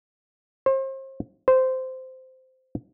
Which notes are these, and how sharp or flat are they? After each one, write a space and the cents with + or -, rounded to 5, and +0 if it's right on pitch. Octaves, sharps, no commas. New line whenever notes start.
C5 +35
C5 -15